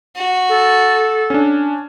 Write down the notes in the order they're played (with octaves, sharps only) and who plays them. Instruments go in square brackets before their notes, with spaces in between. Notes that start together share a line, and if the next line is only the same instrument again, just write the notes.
[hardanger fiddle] F#4
[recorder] A4
[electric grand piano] C#4 D4